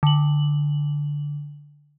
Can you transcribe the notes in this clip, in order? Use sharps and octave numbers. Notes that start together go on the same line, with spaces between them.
D3 F#7